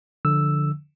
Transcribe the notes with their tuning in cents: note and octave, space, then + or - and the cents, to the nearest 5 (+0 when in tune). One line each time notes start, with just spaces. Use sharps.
D3 +0 F3 +0 E6 +0